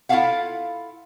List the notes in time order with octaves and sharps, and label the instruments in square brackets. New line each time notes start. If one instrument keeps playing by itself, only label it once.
[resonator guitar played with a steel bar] E4 F4 G#4 A4 F5 F#5